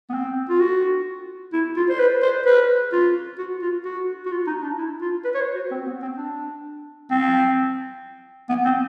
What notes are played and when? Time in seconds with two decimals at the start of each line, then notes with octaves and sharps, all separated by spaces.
0.10 B3
0.14 C4
0.49 F4
0.60 F#4
1.53 E4
1.76 F4
1.89 C5
1.99 B4
2.22 C5
2.46 B4
2.92 F4
3.38 F#4
3.61 F4
3.85 F#4
4.26 F#4
4.31 F4
4.47 D#4
4.62 D4
4.77 E4
5.01 F4
5.25 B4
5.34 C#5
5.40 C5
5.55 F#4
5.71 C4
5.86 B3
6.02 C4
6.17 D4
7.10 C4
8.49 B3
8.65 C4